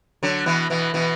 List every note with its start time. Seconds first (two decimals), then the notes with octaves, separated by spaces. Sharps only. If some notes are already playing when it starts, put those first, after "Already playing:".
0.23 D3 F#3
0.46 B2 E3
0.70 B2 E3
0.94 B2 E3